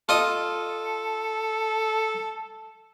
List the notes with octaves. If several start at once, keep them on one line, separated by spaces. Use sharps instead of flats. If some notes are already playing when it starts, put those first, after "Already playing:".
F4 A4 D#5 D#6